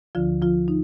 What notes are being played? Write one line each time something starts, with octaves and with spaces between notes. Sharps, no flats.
D2 D3 F3 F4
F3 F4
D#4